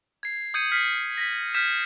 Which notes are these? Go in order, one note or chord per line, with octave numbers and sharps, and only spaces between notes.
G#6 C7
D#6 G6 G#6 C#7 D#7
F6 B6 C7
A#6 B6
F6 G6 G#6 B6 E7